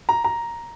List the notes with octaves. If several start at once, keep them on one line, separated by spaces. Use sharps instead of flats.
A#5
A#5